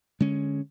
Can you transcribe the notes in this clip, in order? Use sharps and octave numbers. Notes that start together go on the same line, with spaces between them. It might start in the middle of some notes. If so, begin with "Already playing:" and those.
D3 G#3 C#4